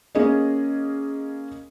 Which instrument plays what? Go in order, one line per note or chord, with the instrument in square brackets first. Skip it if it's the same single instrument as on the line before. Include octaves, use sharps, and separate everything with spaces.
[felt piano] A#3 C#4 G#4 D#5